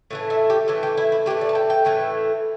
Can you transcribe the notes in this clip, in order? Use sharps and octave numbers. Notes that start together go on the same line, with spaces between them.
A2 E3 A3
E5
G4
A2 E3 A3 A4
G4
E4
E4
A2 E3 A3 G4
D5
A5
G5
G5
A2 E3 A3